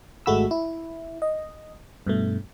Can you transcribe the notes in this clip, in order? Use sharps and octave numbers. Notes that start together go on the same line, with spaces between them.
G#1 G#3 A3 F#4 B5 E6
E4
D#5
G2 B2 A3